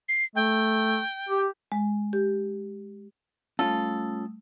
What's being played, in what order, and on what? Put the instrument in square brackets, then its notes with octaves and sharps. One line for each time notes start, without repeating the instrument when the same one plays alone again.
[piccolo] C7
[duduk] A3 [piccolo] G5
[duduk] G4
[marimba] G#3
G4
[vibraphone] G3 A3 D#6 [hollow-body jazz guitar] C#4 F4 [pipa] A4